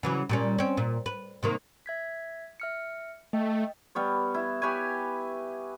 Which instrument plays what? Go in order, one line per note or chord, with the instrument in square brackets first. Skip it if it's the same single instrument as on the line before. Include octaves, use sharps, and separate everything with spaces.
[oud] C#3 E3 F#3
A#2 G3 C#4
C4 C#4
A#2
B4
C3 D#3 A#3
[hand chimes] E5 G#6 B6
E5 F6 C#7
[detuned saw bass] A3 [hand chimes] D#5 G5
[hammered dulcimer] G3 B3 C#5
E4
G4 B4 C#5 G#5